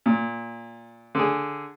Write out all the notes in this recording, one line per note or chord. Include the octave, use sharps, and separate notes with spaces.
A#2
D3 G#4